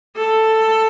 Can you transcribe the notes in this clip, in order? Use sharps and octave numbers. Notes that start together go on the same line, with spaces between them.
A4